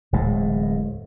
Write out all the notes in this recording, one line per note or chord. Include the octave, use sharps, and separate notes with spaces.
D1 E2 A2 G#3